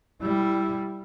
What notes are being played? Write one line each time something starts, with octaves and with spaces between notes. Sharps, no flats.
G3 E4